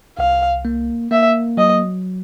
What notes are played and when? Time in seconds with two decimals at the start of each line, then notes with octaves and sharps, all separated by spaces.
0.18 C2 F5
0.65 A#3
1.11 A#3 E5
1.57 F#3 D#5